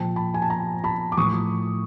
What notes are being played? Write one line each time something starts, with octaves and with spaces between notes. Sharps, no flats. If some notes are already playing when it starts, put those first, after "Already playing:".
Already playing: A#2 F3 G5 A5
A5 B5
G#5
A5
G#5 A#5
A5 B5
D6
A2 F3 C#6 D#6